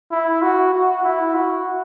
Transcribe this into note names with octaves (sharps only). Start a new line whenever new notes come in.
E4
F#4
F#4
E4
F#4